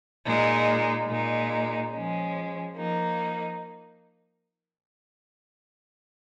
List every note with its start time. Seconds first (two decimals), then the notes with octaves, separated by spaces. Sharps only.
0.25 A#2 G#3 D#4
1.08 A#2 G#3 D#4
1.92 F3 G#3 C#4
2.74 F3 A#3 D#4